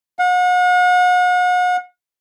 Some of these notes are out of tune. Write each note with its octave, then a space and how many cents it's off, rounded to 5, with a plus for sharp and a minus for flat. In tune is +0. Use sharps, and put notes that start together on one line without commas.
F#5 -40